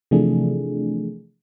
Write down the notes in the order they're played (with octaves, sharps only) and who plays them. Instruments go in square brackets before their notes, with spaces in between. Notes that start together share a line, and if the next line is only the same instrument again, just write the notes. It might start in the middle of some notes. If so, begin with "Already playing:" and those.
[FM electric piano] C3 E3 F3 A3 D4 G#4